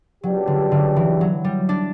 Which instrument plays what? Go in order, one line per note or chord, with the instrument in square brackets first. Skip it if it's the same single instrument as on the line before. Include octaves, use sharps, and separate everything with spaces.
[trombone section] C#2 B2 G3 D4 G4 [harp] F#3
[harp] D3
D3
E3
F#3
G3
D4